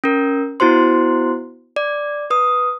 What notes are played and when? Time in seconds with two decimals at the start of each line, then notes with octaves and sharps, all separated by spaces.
0.04 C#4 A#4
0.60 B3 E4 F#4 C5 C6
1.76 D5
2.30 B4 D#6